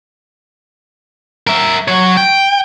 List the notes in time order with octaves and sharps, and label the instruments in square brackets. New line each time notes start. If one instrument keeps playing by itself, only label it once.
[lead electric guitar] A#4 E5
F#3 C#5
G5